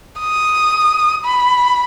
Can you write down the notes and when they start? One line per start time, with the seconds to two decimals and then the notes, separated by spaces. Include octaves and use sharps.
0.20 D#6
1.25 B5